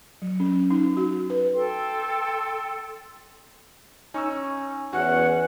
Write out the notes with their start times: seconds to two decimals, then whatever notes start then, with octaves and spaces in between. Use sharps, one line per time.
0.22 F#3
0.40 C#4
0.70 D#4
0.97 F#4
1.30 B4
1.54 A4 G5 C6
4.14 C#4 D#4 C#6 E6
4.93 E2 C#4 F#4 F#5